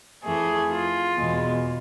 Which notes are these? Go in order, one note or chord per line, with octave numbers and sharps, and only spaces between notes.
F2 E3 A3 G#4
F4
E2 B2 G#3